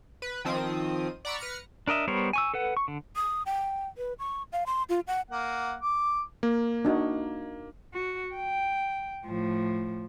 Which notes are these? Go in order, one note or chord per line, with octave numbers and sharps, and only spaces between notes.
B4
D#3 F3 C4 D#6
D5 F#5 A#5 B5 C#6 E6
B4 F6 A#6 C#7
D4 A#4 D#5 E5
G3 B3 A#4 C5 C#5
G#5 C#6 E6
A4 B4 F#5
C#6
D3
D#6
G5
B4
C#6
F5
C6
F4
F#5
A#3 F#5
D6
A#3
D4 D#4 F#4
F#4
G5
A2 F3